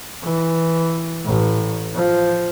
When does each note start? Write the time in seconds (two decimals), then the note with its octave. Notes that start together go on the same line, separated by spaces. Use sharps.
0.23 E3
1.26 A1
1.95 F3